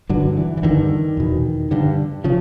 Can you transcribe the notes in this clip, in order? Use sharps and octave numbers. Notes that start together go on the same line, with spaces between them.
G2 D3 F#3
E3
E3
G2 D3 D#3
E2 B2
G2 D3
C#3 F3